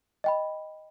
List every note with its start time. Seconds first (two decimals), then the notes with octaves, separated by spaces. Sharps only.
0.24 D#5 G5 B5